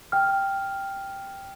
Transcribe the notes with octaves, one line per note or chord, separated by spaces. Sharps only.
G5 F6